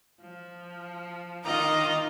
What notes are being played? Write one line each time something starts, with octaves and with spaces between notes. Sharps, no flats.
F3
D#3 D#4 F4 D#5 A#5 D6